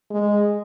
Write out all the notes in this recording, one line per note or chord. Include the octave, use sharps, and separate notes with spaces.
G#3